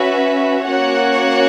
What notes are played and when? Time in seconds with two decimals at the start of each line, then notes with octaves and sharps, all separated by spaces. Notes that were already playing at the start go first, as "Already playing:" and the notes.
Already playing: C#4 F#4 B4 E5
0.69 A#3 C#4 F#4 C#5 F#5